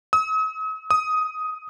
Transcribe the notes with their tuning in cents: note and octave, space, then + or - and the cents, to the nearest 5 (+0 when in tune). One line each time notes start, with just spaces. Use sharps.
D#6 +45
D#6 +10